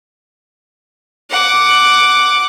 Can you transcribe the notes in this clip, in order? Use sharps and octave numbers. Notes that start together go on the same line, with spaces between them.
F#5 D6